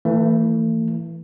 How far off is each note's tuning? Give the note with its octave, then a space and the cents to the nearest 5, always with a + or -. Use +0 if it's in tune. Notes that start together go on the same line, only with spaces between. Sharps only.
E3 +0 A3 +40